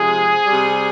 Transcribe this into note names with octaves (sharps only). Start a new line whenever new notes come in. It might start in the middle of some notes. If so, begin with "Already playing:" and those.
Already playing: C3 F3 G#3 G#4
C3 G3